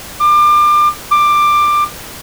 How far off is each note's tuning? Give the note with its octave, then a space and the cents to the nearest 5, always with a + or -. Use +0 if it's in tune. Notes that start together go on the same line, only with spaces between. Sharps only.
D6 +30
D6 +15